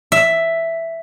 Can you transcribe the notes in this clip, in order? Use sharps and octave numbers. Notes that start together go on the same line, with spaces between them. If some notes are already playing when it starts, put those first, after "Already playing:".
E5